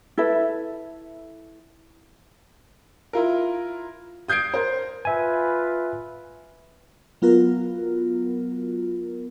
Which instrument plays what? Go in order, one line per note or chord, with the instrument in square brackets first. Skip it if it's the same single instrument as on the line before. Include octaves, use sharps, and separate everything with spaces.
[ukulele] E4 A4 B4 E5
[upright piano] E4 F4 A#4
D#6 G6 G#6 C7 D7
A#4 C5
[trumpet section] F4 B4 [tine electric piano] E5 G#5
[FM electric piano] F#3 B3 F4 F#4 A#4